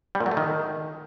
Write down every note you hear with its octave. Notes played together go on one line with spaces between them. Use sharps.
G3
A#2
F#3
A3
D#3